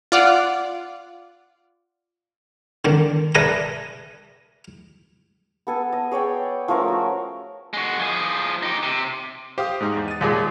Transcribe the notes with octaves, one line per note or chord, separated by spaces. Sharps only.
F4 D5 F#5
D3 D#3 D4
A4 B4 D5 E5 G#5 A#5
B3 A4 G#5
D#5
G#4 C#5 D5 G5
F3 A3 C#4 A#4
F#4
G#3 F#4
F3 G#4
D#4 G4
C3
G4 C5 F5 D#6
G#2 G#3 D#4
E2
A6 D#7
D#2 A#2 G#3